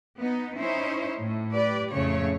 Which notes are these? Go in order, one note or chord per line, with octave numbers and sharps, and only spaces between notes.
B3 D#4
C#4 D#4 E4 C5 C#5
A2
G4 B4 D5
F2 A2 C#3 A3 C#5